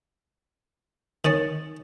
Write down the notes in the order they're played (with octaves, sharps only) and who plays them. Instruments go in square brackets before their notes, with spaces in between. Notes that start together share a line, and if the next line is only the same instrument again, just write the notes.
[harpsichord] D#3 C#4 [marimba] D#4 A6